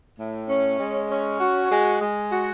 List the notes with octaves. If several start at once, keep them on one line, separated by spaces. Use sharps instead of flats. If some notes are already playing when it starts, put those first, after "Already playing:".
A2
C#4
G#3
C#4
F#4
G#3
G#3
F#4